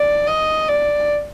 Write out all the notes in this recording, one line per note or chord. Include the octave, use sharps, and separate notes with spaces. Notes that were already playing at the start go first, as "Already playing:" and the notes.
Already playing: D5
D#5
D5